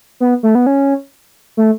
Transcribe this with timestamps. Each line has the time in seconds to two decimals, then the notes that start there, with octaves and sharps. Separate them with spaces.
0.20 B3
0.43 A3
0.55 B3
0.66 C#4
1.57 A3